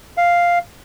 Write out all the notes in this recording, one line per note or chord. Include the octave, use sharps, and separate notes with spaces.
F5